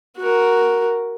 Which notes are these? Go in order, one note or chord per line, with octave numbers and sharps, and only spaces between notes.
F#4 A#4